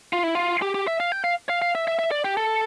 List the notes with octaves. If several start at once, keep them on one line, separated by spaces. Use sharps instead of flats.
F4
E4
F4
G4
G4
E5
F5
G5
F5
F5
F5
E5
E5
E5
D5
G4
A4